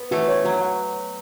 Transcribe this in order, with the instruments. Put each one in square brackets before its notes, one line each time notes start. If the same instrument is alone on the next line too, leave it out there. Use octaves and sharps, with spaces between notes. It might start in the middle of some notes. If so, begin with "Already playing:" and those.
Already playing: [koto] B3
[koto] E3 A3 [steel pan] F#4
[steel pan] C#5
[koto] F#3 [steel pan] F#4
[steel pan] F#5